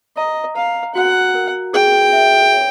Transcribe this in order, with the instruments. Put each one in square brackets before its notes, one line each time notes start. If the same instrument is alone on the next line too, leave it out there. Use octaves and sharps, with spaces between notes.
[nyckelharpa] D#5 [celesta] A#5
[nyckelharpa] F5 [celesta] A#5
[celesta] F#4 [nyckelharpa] F#5
[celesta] A#4
[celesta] G#4 [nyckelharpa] G5
[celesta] E5
C#5